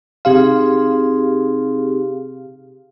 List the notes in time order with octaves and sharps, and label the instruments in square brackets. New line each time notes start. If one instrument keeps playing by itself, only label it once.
[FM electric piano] C3 G4 F5 [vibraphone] C4 D#4 G#4